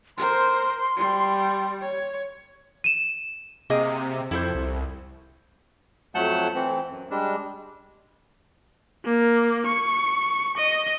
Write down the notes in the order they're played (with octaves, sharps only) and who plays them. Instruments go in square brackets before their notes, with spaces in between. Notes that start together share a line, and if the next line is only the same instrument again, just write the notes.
[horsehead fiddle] A#4 C5 [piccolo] C6
[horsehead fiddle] G3
C#5
[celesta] D#7 E7
[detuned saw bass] C3 [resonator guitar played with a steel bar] A#3 G#4 D#5
[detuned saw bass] F2 [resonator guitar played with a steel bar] E4 A4 C5
[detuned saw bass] C2
[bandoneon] F2 F#3 A3 F#5 A5 G6
E3 A3 C4
F#2
G3 G#3 D4
[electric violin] A#3
C#6
D#5